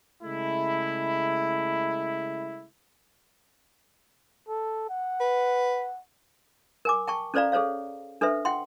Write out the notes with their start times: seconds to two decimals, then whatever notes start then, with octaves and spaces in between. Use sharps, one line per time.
0.23 C#3 G#3 A3 E4
4.49 A4
4.90 F#5
5.20 B4
6.85 A#4 G#5 D6
7.07 G5 A5 C#6
7.34 C#4 A4 C5 D5 F5 A#5
7.52 G#4 A4 C5 C#5 F5
8.21 D4 A4 B4 C5 E5
8.45 F#5 G5 C6